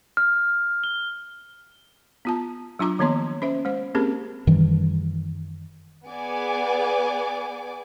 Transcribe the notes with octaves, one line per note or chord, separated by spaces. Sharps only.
F6
G7
B3 F4 A5
F#3 D4 F4 A#5 D6
D#3 F3 A#3 B3 C#5 C6
C#4 C5 E5
G#3 C5
A#3 C4 C#4 G4 G#4 A#4
F#2 D#3 E3 G3
B3 G#4 D5 G#5 D6